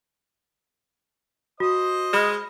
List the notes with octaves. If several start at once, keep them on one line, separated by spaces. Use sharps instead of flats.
F#4 C5 D#5 D#6
G#3 B5 F6